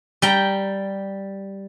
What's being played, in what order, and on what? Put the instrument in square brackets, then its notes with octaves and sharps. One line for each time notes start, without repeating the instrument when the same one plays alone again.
[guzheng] G3 G5 A#5